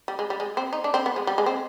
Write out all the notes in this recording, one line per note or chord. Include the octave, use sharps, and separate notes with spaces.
G3
G#3
G3
G#3
C4
D#4
D4
C4
B3
G#3
G3
G#3
C4